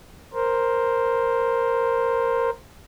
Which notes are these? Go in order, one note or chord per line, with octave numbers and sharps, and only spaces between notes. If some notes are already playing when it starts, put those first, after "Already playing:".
A#4 C5